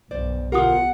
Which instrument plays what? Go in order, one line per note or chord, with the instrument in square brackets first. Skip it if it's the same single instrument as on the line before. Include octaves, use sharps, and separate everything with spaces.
[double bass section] B1 G2 [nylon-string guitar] C5 D5
[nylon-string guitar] D2 F4 A#4 [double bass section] B2 [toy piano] G4 D#6 [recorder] F#5